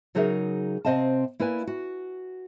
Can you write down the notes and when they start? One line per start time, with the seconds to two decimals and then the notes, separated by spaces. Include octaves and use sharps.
0.15 C#3 F#3 D#4 G#4 A#4 E5
0.85 C3 C4 D#5 F5 A5
1.40 A#3 E4 B4 D5 G#5
1.67 F#4